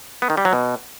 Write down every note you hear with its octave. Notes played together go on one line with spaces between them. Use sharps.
B3
D#3
G3
F#3
B2